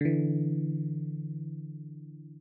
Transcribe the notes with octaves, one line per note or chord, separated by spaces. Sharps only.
D3 E3